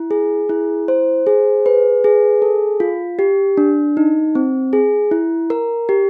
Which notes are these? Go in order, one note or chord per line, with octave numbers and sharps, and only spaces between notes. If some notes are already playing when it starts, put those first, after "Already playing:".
Already playing: E4
G#4
E4
C5
G#4
B4
G#4
A4
F4
G4
D4
D#4
C4
G#4
E4
A#4
G4